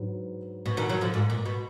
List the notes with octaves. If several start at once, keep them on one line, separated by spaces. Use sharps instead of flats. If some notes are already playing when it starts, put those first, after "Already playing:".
Already playing: G#2 F#3 D4 G#4 B4
B2
B2 D#3
D#3 F#3
D3 F3
G#2
A#2
B2